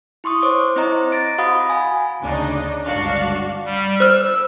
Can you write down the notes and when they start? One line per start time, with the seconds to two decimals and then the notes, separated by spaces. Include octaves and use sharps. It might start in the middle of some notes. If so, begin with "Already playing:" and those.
0.24 E4 C6 C#6 D#6
0.42 C5 C#5 D6
0.76 C4 E4 C5 D#5 A#5
1.12 A6 A#6 D7
1.38 F#4 F5 F#5 B5 D#6
1.70 G#5
2.21 D2 C#3 D4 D#4 D#5
2.86 G1 C#2 D4 F#4 F5
3.65 G3
4.00 C5 E6 F6